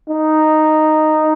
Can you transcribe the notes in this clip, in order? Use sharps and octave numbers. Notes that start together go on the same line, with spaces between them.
D#4